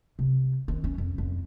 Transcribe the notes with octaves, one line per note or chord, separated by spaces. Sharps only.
C3
D#3 C4
C#4
F2
F2